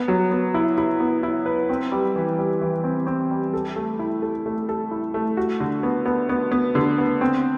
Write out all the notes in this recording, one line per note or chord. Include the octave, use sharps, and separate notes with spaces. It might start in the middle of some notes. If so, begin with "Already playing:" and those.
Already playing: B3
F#3
B3
E4
E4
B3
E4
B4
C4
G3
E3
G3
E3
C4
C4
G3
A4
A3
E4
A4
A3
A4
E4
A3
F#4
D3
B3
B3
B3
B3
D3
B3
C4